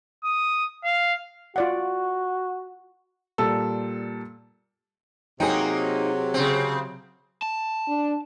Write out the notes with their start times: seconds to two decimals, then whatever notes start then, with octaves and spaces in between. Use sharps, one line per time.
0.24 D#6
0.84 F5
1.56 F4 F#4 D5 F#5
3.38 A#2 G3 A4 E6
5.40 C3 F#3 A#3 D#4 G#4 G5
6.34 C#3 C4
7.42 A5
7.88 D4